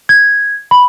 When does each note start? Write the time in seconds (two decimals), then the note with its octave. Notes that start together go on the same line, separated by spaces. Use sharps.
0.09 G#6
0.71 B5